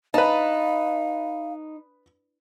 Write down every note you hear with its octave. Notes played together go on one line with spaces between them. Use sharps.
D#4 B4 F5 A5